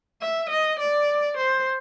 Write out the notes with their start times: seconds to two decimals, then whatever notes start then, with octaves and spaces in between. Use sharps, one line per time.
0.21 E5
0.50 D#5
0.80 D5
1.38 C5